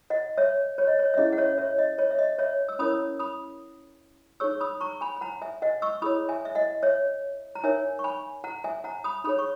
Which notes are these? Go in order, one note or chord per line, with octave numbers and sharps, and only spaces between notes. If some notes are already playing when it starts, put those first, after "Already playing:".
D#5 F#5
C#5 E5
C#5
D#5
C#5
E5
C#4 E4 G#4 D#5
F#5
C#5 E5
C#5 E5
D#5
C#5
E5
D#5
C#5 E5
E6
C#4 E4 A#4 C#5 B5 D#6
B5 D#6
D#4 G#4 C#5 C#6 E6
B5 D#6
A#5 C#6
G#5 B5
B5
F#5 A#5
E5 G#5
D#5 F#5
C#6 E6
E4 G#4 C#5 B5 D#6
E5 G#5
E5
D#5 F#5
C#5 E5
A#5
D#4 A#4 C#5 E5 G#5
C#6
G#5 B5
F#5 A#5
E5 G#5
F#5 A#5
B5 D#6
D#4 G#4 C#5 B5 D#6
C#6